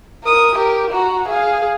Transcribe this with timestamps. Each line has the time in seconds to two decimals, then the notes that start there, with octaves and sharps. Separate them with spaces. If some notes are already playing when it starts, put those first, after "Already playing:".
0.24 A#4 D#6
0.55 G4 A#4
0.91 F#4 A#5
1.28 G#4 F5